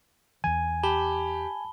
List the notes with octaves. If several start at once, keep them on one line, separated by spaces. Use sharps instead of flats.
E2 E3 G#5
G4 A5 B5 G7